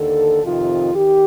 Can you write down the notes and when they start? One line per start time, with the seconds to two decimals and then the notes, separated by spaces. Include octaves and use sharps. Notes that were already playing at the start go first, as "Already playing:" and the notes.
Already playing: D#2 D3 A4
0.42 F2 C3 D#3 F4
0.94 D#3 G4